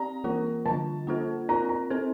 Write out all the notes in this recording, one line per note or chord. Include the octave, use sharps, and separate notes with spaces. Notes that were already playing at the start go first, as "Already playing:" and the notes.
Already playing: C4 G4 D5 A#5
E3 A#3 F4 A#4
D3 G3 D4 F4 A5
A#3 D4 F4 A4 C5
C4 F4 A#4 D5 A#5
A#5
C4 E4 A4 C5